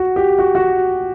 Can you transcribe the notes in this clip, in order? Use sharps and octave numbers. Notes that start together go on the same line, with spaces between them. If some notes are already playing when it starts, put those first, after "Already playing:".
Already playing: F#4
G4
F#4
F#4